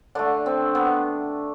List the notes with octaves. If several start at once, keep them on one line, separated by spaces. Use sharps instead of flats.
D3 A3 D4
C4
B3